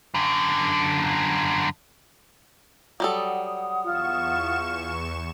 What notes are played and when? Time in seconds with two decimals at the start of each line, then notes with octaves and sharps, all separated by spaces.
0.14 F#2 D3
3.00 F#3 G3 A4 F#5 D#6
3.84 E2 F4 C#6 E7